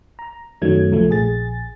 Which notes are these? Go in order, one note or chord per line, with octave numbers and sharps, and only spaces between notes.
A#5
F#2 D#3 F#3 A3 G#6
C2 F3 A3
A#1 G#4 A6